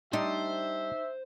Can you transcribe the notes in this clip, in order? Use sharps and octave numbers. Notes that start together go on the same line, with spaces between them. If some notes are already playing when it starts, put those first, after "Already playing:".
G3 D4 D#4 G4 C5 E5